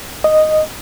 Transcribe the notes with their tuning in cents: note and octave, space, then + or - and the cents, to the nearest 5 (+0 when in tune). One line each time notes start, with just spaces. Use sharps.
D#5 -5